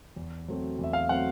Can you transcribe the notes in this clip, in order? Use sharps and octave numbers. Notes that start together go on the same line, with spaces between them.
E2
B2 F#3 A3 C4
E2
E5
F5
B2 F#3 A3 C4 F#5